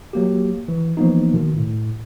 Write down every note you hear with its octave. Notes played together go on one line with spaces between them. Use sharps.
F#3 A#3 G4
E3
E3 F3 A#3 B3 D#4
B2 D#3
A2